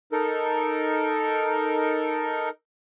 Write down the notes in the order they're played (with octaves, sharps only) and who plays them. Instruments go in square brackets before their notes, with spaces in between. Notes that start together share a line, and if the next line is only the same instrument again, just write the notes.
[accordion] D#4 A4 A#4